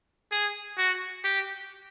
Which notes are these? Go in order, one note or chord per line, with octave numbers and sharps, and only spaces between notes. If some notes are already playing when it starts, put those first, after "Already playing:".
G#4
F#4
G4